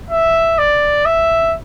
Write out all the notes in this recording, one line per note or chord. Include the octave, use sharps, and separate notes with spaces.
E5
D5
E5